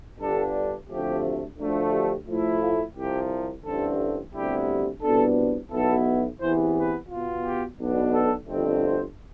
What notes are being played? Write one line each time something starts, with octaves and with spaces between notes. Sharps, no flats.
G1 G2 D3 G3 D4 A4
D2 C3 F3 A3 G4
D2 D3 F3 A3
G4
A2 F3 A3 E4
F4
C2 C3 F3 G4
A1 G2 D3 A3 C4 A4
D2 C3 G3 B3 E4 G4
C2 B2 B3 D4 A4
B1 B2 B3 E4 A4
E2 C3 E3 B3 C5
B4
B2 B3 F4
G4
B1 B2 B3 D4
A4
G1 F2 D3 A3 C4
C5